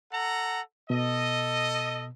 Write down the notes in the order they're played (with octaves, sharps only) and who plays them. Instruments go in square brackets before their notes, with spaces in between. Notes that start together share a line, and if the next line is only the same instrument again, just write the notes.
[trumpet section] A4 F#5 A#5
[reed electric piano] B2 [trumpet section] A4 D#5